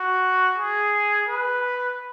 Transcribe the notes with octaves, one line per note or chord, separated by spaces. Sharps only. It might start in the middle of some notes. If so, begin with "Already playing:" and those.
Already playing: F#4
G#4
B4